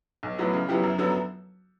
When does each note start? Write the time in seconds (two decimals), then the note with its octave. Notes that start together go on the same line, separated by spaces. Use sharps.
0.23 B1
0.39 A2 F#3 B3 E4
0.53 C#3
0.69 F#3 B3 E4 G4
0.83 F#2
0.98 D3 F#3 B3